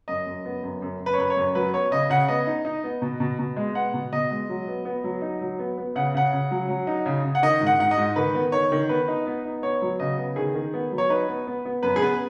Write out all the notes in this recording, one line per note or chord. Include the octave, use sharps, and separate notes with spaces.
F#2 D#5
F#2
B3
F#2
F#2
F#2
B4
C#5
F#2 B4
C#5
F#2
F#3 B4
B3 C#5
C#3 D#5
C#3 F#5
B3 D#5
D#4
D#4
B3
B2
B2
B2
G#3
B3 F#5
B2
B2 D#5
G#3
F#3
B3
B3
F#3
D#4
F#3
B3
B3
C#3 F#5
C#3 F#5
C#3
F#3
F#3
D#4
C#3
C#3
F#5
D#3 D#5
G#2
F#5
G#2 F#5
D#5
G#2
D#3 B4
B3
D#3 C#5
D#3
B3 B4
D#4
B3
D#4
B3 C#5
F#3
C#3 D#5
B3
D#3 G#4
D#3
B3
F#3
C#5
D#4 B4
B3
B3
B3
F#2 B4
G#4
B3 B4